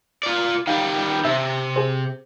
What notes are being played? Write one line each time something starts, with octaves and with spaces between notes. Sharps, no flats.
F4 D5
D#3 G3 F5
C3 E5
G#4 C5